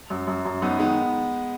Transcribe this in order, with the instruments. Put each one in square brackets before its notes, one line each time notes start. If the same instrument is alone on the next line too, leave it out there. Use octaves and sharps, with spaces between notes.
[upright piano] F#2
F#2
F#2
[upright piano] F#2 [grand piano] B3 D#4
[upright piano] D#3 [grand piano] G#3 B3